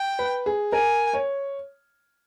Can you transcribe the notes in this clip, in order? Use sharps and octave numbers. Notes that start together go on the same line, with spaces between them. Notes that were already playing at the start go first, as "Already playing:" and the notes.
Already playing: G5
B4
G#4
A#4 G#5
C#5